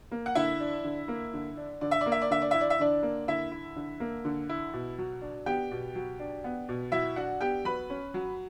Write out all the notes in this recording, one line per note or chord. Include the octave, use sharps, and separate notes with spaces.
A#3
F#5
D3 E4 E5
D4
D3
A#3
D3
D4
D3 D5
E5
D5
A#3
E5
D5
D3 E5
D5
E4 E5
D5
E5
D3 D4 D5
A#3
D3 E4 E5
E4
D3
A#3
D3
E4
B2
F#3
D4
B3 G4 G5
B2
F#3
D4
B3
B2
F#3 E4 E5
D4 F#4 F#5
B3 G4 G5
F#3 B4 B5
C#4
F#3